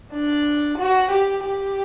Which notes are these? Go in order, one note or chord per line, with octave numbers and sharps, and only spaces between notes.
D4
F#4
G4
G4